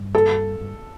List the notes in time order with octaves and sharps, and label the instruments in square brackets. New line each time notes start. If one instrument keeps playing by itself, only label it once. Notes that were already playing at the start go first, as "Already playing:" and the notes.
Already playing: [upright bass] G2
[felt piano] A4
[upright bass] G2